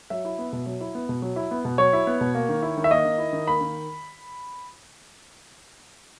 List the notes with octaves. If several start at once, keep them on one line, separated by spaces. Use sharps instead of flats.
F#3 E5
E4
B3
B2
F#3
E4
B3
B2
F#3
E4
B3
B2
F#3 C#5
E4
B3
B2
A#3
D#3
E4
D#3
E5
A#3 D#5
D#3
E4
D#3
A#3 B5
D#3